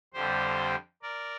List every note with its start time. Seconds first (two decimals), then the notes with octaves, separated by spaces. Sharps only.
0.14 F2 D3 G3 G4 C5
1.02 A#4 D5